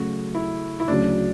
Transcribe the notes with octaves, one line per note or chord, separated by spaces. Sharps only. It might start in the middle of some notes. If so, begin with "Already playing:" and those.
Already playing: C#3 F#3 A3 F#4
E4
E4
D2 C#3 F#3 D4